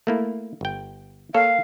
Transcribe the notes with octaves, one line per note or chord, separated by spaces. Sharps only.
A3 A#3 E4
G1 G5
A#3 A4 C#5 F5